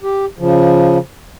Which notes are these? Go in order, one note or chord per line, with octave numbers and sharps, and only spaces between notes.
G4
C#3 F3